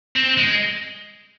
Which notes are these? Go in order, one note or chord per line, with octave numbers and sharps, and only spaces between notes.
C4
G#3